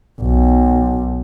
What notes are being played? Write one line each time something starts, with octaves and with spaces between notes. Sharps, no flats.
B1